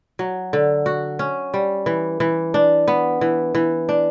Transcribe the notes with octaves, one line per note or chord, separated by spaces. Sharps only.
F#3
D3
F#4
C#4
G3
E3
E3
D4
B3
E3
E3
D4